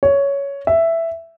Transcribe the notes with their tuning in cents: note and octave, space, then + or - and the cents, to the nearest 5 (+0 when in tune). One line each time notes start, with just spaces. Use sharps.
C#5 +10
E5 +5